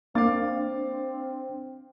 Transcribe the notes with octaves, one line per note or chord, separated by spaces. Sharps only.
A#3 C4 D4 F5 D6 A6